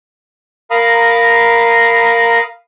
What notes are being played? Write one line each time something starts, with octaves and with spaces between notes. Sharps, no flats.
A#4 F5 A#5 B5 D#6